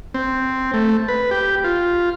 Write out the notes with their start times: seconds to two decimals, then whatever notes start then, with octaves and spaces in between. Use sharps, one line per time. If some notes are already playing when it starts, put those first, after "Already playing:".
0.14 C4
0.74 A3
1.08 B4
1.31 G4
1.64 F4